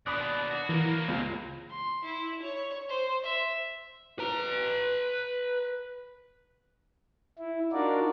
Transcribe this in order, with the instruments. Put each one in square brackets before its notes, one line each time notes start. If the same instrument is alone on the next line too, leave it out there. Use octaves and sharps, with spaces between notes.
[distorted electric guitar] D#2 B2 [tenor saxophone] D4 [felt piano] B5 D#6 F#6
[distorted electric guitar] F#4
[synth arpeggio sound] E3 [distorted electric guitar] F#3 A#3 [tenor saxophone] A#4
[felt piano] C#2
[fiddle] C6
E4
C#5
C5
E5
[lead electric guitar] B4 A#5
[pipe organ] E4
D4 D#4 F4 F#4 A#4 D5